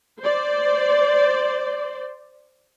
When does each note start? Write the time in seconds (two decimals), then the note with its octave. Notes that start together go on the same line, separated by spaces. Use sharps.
0.19 C5 D5